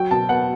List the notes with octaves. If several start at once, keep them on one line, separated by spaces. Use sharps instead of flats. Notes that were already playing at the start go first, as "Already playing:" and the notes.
Already playing: F#3 G5
B2 A5
B3 F#5